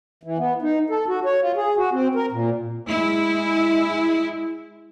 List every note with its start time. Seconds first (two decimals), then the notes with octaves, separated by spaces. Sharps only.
0.23 E3
0.38 B3
0.62 D#4
0.90 A4
1.08 F#4
1.25 C#5
1.41 F4
1.56 G#4
1.77 F#4
1.93 C4
2.15 A#4
2.32 A#2
2.89 G#3 E4